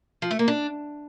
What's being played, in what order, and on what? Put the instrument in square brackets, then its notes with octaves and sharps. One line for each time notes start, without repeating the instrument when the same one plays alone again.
[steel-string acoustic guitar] F3
A3
A#3
D4